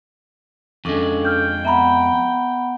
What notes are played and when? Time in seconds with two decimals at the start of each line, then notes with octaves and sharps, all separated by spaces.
0.85 F2 G#3 C#4 D4 A4
1.25 G5 F6 G6
1.65 B3 E5 F#5 A#5 B5